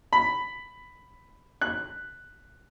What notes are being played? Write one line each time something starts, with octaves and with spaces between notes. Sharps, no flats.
B5
F#6